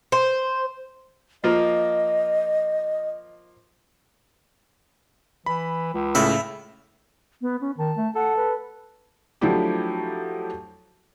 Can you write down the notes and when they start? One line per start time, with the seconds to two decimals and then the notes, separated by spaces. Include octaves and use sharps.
0.12 C5
1.44 F3 A#3 F4 D#5
5.46 E3 B5
5.94 C#2
6.15 A2 C#3 E5 B5
7.41 B3
7.61 C#4
7.78 D#3 A5
7.97 A3
8.15 A4 F#5
8.37 B4
9.41 F3 F#3 A3 D4 E4 G4